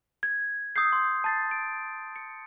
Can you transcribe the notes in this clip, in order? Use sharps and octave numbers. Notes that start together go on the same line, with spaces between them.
G#6
D#6 E6 G6 C7
C6 G6
A5 A6 C7
D7
C#7